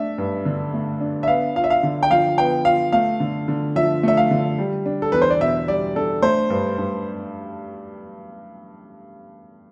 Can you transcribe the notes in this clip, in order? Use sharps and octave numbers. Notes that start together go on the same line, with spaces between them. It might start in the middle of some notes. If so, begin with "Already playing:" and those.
Already playing: A3 D4 E5
G2
D3
A3
D4
E5
B3 F5
F4 F5
E5
F5
D3
G5
F3 F5
B3 G5
F4 F5
A3 F5
D3
D3
F3 E5
A3 E5
F5
D3
G3
D4
A4
E2 B4
C5
D5
B2 E5
G3 D5
D4 A4
A3 C5
G2
G2